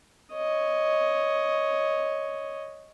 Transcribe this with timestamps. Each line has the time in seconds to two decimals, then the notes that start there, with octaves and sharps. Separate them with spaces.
0.33 C#5 D#5